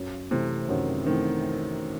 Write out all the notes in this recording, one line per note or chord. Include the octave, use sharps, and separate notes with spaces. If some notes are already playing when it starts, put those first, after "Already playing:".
Already playing: F#2
C3 E3 A3 C4
F#2 D#3
D#3 E3 A3 C4